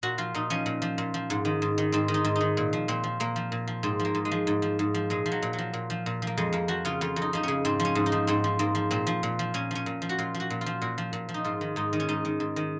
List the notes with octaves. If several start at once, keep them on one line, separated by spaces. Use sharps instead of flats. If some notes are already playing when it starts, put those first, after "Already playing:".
A#2 F#4
F3 F4
A#2 D#4
F3 C#4
A#2
F3
A#2
F3
G#2
D#3
G#2
D#3
G#2 C4
D#3
D#4
G#2
D#3 D#4
A#2
F3
A#2 C4
F3
A#2 A#3
F3
A#2
F3
G#2 C4
F3
A#3
G#2
G#3
F3
G#2
F3
G#2
F3
A#2 G#3
F3
F#3
A#2
F#3
F3
A#2
F3
A#2
F3 A#3
F2 G#3
F2 A#3
F3 F#4
C#3 F4
F2 F4
F2
D#4
F3 D#4
C#3 C#4
G#2 C4
F3
C#4
G#2
D#4
F3
G#2 C4
F3
G#2 A#3
F3
A#2 C4
F3
A#2
F3
A#2 C#4
F3 C#4
A#2
F3
F#4
A#2 F4
F3
F#4
A#2
F4
F3
A#2 F#4
F3
A#2
F3
D#4
G#2 F4
D#3
G#2 D#4
D#3
C#4
G#2 D#4
D#3
G#2
D#3